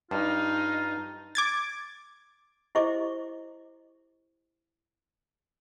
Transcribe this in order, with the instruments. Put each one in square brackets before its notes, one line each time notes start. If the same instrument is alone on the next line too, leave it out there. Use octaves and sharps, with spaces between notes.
[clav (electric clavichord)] G2 [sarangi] D#4 [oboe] F4
[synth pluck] D6 G#6 A6
[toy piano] E4 G4 C5 D#5 C#6 D6